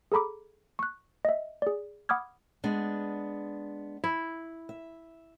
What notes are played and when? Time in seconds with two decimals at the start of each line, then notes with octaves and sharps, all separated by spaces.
0.12 G#4 A4 A#5 B5 D6
0.79 C#6 F#6
1.25 D#5 E5
1.62 G#4 D5
2.09 F#5 B5 D6 D#6 F6 G#6
2.64 G#3 B3 D4
4.04 E4
4.69 E5